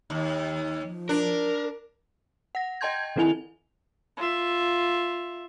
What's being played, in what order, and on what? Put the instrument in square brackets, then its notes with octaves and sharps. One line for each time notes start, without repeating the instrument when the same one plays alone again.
[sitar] D#2
[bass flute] F3
[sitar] D4 [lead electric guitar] A#4
[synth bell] F#5 A#6
D#5 G5 A5 C6 G6 G#6
D#3 F3 C4 E4 G#5 F7
[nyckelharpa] F4 E5